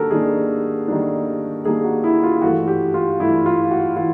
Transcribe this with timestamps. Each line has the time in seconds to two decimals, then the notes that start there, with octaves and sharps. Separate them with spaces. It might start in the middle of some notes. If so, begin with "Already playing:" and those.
Already playing: D#3 G3 A#3 D4 F#4 G4 A4 A#4
0.11 D#3 G3 A#3 D4 G#4
0.88 D#3 G3 A#3 D4
1.65 D#3 G3 A#3 D4 G#4
1.84 F#4
2.04 E4
2.23 F4
2.42 G2 E3 A3 F#4
2.68 G4
2.94 F4
3.19 G2 E3 A3 E4
3.46 F4
3.71 F#4
3.97 E3 F4